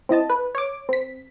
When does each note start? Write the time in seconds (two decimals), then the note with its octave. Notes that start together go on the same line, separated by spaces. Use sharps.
0.09 C4 E4 D#5 A5
0.30 B4
0.55 C#5 D6
0.89 C4 B6